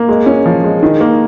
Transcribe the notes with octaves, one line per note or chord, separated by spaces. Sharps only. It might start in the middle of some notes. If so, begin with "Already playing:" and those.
Already playing: A#3
G#3
C#4
F3
G#3
D#3
A#3